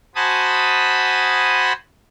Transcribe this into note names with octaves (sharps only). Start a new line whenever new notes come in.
F#4 C5 G#5 A5 B5 D#6